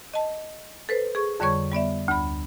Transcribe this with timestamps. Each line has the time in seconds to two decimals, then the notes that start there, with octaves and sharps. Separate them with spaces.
0.14 D#5 A5
0.89 A4 B4 C5
1.15 G#4 C#6
1.40 F2 D3 G3 C#5 C#6 G#6
1.72 G3 B3 D5 E5
2.08 D2 B5